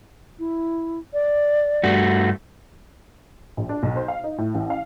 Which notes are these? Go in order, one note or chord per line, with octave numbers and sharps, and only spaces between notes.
E4
D5
G2 A3 F#4
A#1
D4
B1
C5
F5
D#4
A2
A1
F5